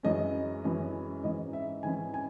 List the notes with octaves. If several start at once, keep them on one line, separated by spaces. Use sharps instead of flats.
F#2 E3 G#3 C#4 D#5
F#2 E3 G#3 C#4
G#2 E3 G#3 C#4 D#5
E5
G#2 E3 G#3 C#4 G#5
G#5